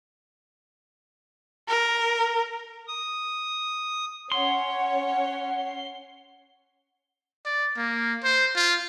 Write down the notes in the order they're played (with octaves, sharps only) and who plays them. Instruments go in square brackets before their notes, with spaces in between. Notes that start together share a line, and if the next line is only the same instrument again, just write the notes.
[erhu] A#4
[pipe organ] D#6
[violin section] C#4 C#5 [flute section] F#5 [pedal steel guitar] C6
[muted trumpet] D5
A#3
C5
F4